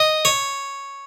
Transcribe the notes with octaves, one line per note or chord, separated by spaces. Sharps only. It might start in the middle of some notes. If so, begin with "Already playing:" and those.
Already playing: D#5
C#5